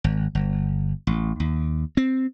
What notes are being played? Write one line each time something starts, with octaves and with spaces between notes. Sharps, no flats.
G#1
G1
A1
D#2
C4